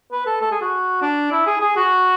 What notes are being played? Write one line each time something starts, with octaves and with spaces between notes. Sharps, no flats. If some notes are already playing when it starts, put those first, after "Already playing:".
B4
A4
A4
G#4
F#4
D4
E4
G#4
G#4
F#4